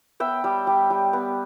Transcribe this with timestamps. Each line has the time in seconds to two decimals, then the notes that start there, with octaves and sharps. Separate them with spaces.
0.20 B3 E5 G5
0.44 G3
0.67 G3
0.90 G3
1.13 B3